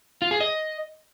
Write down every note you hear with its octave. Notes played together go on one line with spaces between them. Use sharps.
F4
G#4
D#5